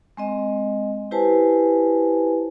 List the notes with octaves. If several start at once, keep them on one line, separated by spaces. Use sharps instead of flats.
G#3 C4 D#5
E4 G4 B4 C5 G#5 A5